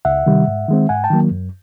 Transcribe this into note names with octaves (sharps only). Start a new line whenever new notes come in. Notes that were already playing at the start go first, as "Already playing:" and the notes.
C#2 E5 F#5
C3 D#3 G3
G#2
D#3 G#3 C4
G#2 F#5 G#5
G5 A5
D#3 F#3 A#3
F#2